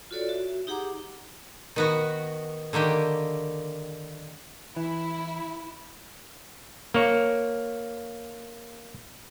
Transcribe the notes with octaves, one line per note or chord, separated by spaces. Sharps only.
F4 F#4 A4 C#5 D5
F#4 E5
D#4 G4 G#4 F#5 A#5 D6
D#3 B3 F#4
D3 D#3 A#3 G4
E3 E4
A#3 C#5